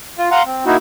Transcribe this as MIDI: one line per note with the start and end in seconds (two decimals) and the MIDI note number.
0.18 0.29 65
0.31 0.43 77
0.31 0.43 78
0.31 0.43 82
0.31 0.43 84
0.46 0.65 60
0.66 0.77 58
0.66 0.77 63
0.66 0.77 64
0.66 0.77 66